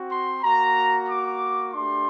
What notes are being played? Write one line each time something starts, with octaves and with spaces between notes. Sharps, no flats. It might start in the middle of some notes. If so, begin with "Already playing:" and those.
Already playing: C4 F#4
C6
A#3 F#4 A#5
D6
A3 D4 G4 C6